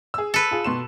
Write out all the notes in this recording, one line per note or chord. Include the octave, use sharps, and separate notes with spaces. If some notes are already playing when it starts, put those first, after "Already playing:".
G#4 E6
A4 B4
F4 G#4
B2 C6 E7